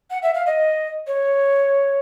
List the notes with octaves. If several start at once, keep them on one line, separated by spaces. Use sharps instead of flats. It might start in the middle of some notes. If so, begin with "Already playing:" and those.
F#5
E5
F5
D#5
C#5